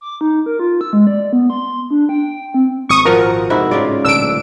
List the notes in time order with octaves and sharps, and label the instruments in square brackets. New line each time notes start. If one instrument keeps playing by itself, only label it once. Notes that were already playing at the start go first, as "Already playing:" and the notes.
[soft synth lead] D6
D#4
A#4
F4
E6
G#3
D5
B3
C6
D4
G5
C4
[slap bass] G#1 [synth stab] C#6 D#6
[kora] A#2 F3 F#4 [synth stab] A#4
[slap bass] F2 C3 [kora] G#2 E4 F#4
[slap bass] A2 [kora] C#3 F4 D5
[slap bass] D1 A#2 D3 [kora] D4 [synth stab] E6 D7